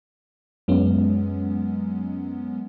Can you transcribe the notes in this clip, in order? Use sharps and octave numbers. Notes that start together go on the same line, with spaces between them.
F#2 F#3 G#3 B3 C#4